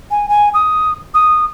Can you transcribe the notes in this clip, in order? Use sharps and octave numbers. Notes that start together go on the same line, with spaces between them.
G#5
G#5
D#6
D#6